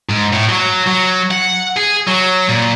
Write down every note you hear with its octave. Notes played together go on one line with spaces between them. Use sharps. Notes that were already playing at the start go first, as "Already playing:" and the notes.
G#2
A2
F#3
F#3
F#5
G#4
F#3
A#2